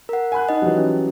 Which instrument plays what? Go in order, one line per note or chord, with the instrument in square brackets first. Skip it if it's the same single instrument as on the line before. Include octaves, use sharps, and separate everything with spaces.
[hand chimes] A#4 F#5
[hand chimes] F#5 [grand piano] G#5 B5 F#6
[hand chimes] D#4 D#5
[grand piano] E3 F#3 G3
[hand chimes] C#4